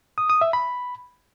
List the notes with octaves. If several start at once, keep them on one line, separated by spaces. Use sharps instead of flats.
D#6
D#6
E5
B5